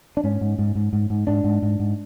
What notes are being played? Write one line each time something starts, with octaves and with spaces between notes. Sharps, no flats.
D4
G#2 C#4
G#2
G#2
G#2
G#2
G#2
G#2 D4
G#2
G#2
G#2